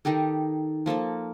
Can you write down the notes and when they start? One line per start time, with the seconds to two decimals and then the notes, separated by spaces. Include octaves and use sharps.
0.05 D#3 D#4 G4 A4
0.86 F3 A#3 A4 A5